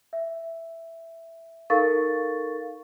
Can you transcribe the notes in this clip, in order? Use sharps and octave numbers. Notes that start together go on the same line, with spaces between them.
E5
D#4 A4 A#4 F5 C#6 A6